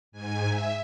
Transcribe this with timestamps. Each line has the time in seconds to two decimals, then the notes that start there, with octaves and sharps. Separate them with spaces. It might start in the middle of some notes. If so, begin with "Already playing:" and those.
0.12 G#2 G#5
0.48 E5